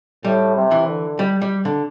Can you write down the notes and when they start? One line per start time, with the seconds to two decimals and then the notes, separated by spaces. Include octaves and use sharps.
0.25 A2 G3
0.56 C3
0.71 E3
0.87 D3
1.19 G3
1.42 G3
1.65 D3